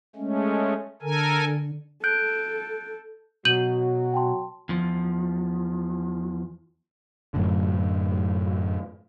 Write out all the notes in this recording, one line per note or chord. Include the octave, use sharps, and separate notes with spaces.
G#3 A3 C#4
D3 A4 A#4 G#5
A4 F#6 G6 D7
B2 F#3 F#4 G6 D#7 F#7
G5 A5 C6
E2 F3
F#2 A2 D3